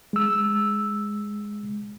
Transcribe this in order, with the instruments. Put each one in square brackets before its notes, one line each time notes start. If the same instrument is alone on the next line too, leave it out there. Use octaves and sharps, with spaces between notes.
[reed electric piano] G#3 E6